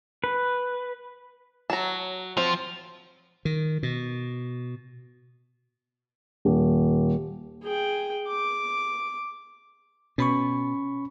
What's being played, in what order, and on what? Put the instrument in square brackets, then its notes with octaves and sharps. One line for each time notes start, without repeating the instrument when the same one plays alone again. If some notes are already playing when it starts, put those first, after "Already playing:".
[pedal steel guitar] B4
[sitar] F#3 [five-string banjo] A5 A#5
[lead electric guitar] F3 [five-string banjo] C4
[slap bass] D#3
B2
[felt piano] D#1
[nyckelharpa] G#4 G5
D6
[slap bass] B2 [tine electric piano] C#4 B5 C#6